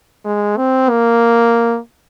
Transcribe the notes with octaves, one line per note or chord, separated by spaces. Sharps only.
G#3
C4
A#3